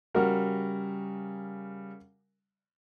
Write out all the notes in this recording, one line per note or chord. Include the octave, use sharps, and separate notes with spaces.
C#3 G3 F#4 A#4